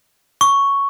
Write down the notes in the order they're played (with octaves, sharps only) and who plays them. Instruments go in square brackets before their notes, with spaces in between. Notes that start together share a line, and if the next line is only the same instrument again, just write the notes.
[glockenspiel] C#6